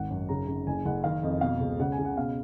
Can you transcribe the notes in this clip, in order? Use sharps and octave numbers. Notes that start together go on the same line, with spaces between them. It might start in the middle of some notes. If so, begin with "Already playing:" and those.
Already playing: G#1 F#5
F#2
C#3 A#5
C#3
F#1 G#5
F#1 F#5
D#3 F5
F2 D#5
B2 F5
C#2
C#3 F#5
G#5
C#3
F#5
B2 F5